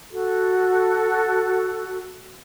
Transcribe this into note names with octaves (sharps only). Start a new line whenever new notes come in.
F#4 A4